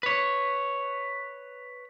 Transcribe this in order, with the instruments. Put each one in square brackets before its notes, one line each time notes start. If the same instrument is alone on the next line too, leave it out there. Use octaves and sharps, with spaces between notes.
[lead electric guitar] B4 C#5